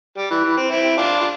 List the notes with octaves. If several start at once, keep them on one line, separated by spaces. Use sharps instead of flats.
G3
E3
E3
C4
C4 E4
D4 F4
F4